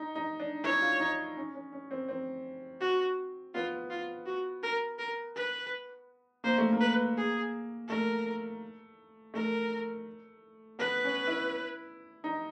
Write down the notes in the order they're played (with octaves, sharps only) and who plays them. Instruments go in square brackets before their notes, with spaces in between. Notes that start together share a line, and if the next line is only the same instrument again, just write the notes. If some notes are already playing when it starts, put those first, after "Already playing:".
Already playing: [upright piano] D#4
D#4
D4
[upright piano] E4 [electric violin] C#5
[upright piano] F4
D#4
C#4
C#4
C#4
C4
C4
[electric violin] F#4
[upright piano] B3 [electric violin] F4
[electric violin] F4
F#4
A#4
A#4
B4
[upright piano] A#3 [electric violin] C5
[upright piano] A3
A#3
[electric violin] B4
G#4
[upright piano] A3 [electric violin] A#4
[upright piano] A3 [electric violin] A#4
[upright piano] B3 [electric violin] B4
[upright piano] C#4
E4
D#4